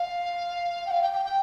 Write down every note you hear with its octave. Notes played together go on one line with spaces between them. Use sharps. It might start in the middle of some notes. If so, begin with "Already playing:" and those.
Already playing: F5
G5
F5
G5
G5
G5